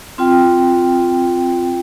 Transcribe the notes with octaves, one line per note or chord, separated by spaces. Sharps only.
C4 F4 G5